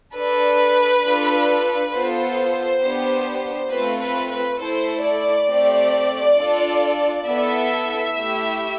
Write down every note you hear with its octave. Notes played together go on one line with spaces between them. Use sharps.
D4 A4 B4
D4 F4 A4
B3 F4 A4 C5
B3 D4 G4
A3 C4 F4 B4
B4
B4
A3 E4 A4 C5
D5
A3 C4 G4
D4 F4 A4
B3 E4 A4 E5
A3 E4 G4